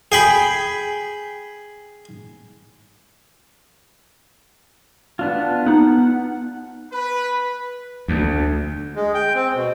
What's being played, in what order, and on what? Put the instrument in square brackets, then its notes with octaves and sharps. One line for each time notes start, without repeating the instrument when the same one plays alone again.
[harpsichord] G#4 G5 B5
[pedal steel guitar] B3 D4 F4
[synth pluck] B3 D#4 [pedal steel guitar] F#5
[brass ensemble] B4
[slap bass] D2
[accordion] G#3
G5
C4
B2